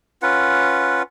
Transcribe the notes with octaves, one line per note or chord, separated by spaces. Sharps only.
C#4 F4 B4 F#5